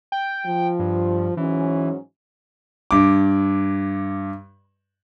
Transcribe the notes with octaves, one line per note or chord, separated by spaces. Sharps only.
G5
F3
G2
G#2 E3 F#3 C#4
G2 D6